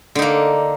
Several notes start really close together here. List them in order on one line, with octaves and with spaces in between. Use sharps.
D3 D#4 A#3